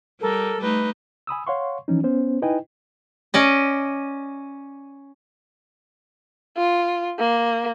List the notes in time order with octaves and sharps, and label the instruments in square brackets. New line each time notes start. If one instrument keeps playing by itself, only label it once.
[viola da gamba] G3 [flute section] A4 A#4
[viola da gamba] G3 A3 D#4 [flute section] B4
[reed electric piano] G#5 B5 D#6 E6
C#5 F5 F#5 C6 C#6
E3 F3 C#4 D#4
B3 C#4 C5
D#4 E4 B4 D#5 G5 G#5
[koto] C#4 D5 D#5
[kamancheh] F4
A#3